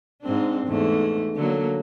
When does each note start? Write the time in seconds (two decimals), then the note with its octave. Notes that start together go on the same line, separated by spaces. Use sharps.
0.22 G#2 C4 D4
0.67 E2 G#2 A3
1.36 D3 F#3 A#3